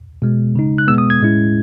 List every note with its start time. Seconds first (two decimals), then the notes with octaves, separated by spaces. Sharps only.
0.22 B2 G#3 B3
0.56 C#3 G#3 D#4
0.78 F#6
0.87 B2 G#3 B3 E6
0.98 D#6
1.10 G#6
1.20 A2 G#3 C#4 E4